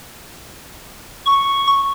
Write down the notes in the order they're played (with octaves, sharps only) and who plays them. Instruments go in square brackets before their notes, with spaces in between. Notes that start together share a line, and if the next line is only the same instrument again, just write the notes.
[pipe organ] C#6